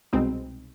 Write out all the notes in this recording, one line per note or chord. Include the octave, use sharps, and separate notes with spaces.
C2 B2 G#3 C4 D#4